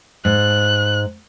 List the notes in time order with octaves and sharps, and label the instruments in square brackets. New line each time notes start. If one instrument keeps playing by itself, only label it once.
[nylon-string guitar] G#2 [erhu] F#6